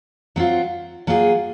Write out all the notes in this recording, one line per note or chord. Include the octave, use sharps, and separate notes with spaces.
F#3 C4 F4
F#3 A#3 F4 G#4